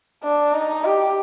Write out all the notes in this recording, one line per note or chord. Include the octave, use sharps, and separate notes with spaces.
D4
D#4
G4